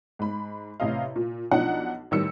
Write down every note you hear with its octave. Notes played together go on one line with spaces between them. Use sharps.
G#2 B5
A1 C3 D#5 F5
A#2
B1 F3 D4 D#4 F#5
A1 D#3 G3 E6 C#7